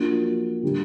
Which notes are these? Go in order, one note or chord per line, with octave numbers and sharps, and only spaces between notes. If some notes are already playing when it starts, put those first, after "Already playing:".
Already playing: F3 A#3 D4 F#4
D3 G3